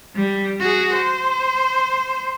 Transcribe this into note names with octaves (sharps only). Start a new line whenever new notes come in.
G3
F#4 G#4
C5